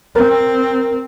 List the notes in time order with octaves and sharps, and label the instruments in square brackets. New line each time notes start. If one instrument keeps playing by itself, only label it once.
[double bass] C4 [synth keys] A#4